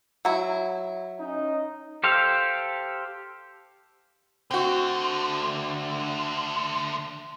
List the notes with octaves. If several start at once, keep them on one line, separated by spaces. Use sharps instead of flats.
F#3 E4
C#4 D#4
G4 A4 C5 F5
D2 D3 C4 F#4